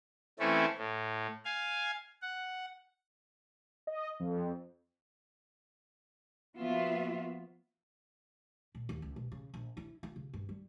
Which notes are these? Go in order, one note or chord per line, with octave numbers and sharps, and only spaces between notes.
E3 A3 C4 C#4 E4 A4
A2
F5 G#5
F#5
D#5
F2
F3 A#3 B3 F4 F#4 E5
A#2
D#2
C#2
B2
C#3
A#1
E4
F4
C#3
G2
G3